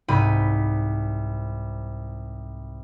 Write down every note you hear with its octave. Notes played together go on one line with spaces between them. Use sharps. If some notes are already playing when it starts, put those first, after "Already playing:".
C2 G#2 B5 D#7